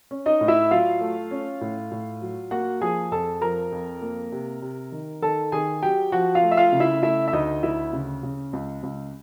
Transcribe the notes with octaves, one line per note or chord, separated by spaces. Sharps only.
C#4
D#4 D#5
A2
E4 E5
F#3 F4 F5
A3
C#4
A2
A2
F#3
A#3 F#4 F#5
F3 G#4 G#5
F2 A4 A5
F3 A#4 A#5
F2
A#3
C3
C3
D#3
D#3 A4 A5
D#3 G#4 G#5
F#3 G4 G5
F3 F#4 F#5
F4 F5
A3
E5
F4 F5
C#3
E4 E5
A3 E4 E5
E5
D2 D#4 D#5
D2 E4 E5
C#3
C#3
C#2
C#2